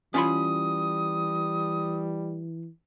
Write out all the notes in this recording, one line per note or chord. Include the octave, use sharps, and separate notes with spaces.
E3 G3 C#4 F4 B5 D#6